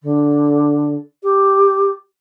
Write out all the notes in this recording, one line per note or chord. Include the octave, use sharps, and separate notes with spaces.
D3
G4